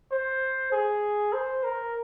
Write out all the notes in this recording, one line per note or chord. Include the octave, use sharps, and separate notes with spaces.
C5
G#4
C5
A#4